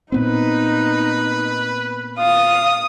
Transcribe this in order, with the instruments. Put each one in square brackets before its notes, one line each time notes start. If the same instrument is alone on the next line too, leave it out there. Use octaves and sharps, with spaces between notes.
[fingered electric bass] A#2 B3 C4 [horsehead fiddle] D#4 [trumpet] B4
[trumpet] F4 [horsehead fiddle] F5 [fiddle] D#6